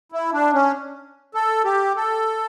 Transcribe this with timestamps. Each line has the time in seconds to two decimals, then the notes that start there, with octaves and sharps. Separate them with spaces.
0.12 E4
0.33 D4
0.53 C#4
1.35 A4
1.65 G4
1.96 A4